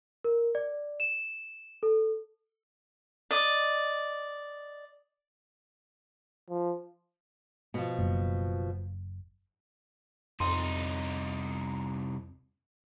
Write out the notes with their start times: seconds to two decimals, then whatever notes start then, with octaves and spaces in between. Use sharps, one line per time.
0.24 A#4
0.55 D5
1.00 E7
1.83 A4
3.31 D5 D#5
6.50 F3
7.74 B2 F3
7.98 F#1
10.40 C2 F2 D#4 C6